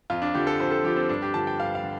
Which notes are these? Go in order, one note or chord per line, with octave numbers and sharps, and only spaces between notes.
F2 F4
D4
D3 F3 G4
A4
F2 C5
A4
D3 F3 G4
C4
G2 D4
G4
D3 F3 A5
G5
G2 F5
F5
D3